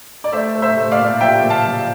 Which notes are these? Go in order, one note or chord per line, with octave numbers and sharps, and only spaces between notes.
D5
A3 C5 E5
A3
C5 E5
A3
D5 F5
A#2
F3 E5 G5
A#2
F5 A5
F3